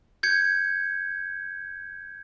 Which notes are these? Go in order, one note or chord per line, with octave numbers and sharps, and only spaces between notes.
G6 G#6 C#7